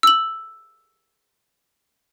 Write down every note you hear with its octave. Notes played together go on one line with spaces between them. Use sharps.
E6 F#7